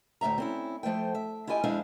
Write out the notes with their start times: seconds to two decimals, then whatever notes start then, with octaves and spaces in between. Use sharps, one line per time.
0.21 D2 A2 C4 E5 A#5
0.38 C4 C#4 E4
0.83 F3 A3 C5 G5
1.15 E5
1.47 E4 F4 G4 D#5 G#5
1.63 F2 G#3 D4 E4 C5 F5